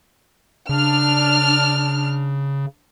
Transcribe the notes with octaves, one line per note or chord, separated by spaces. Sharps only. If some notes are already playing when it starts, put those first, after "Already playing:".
C#3 D4 F6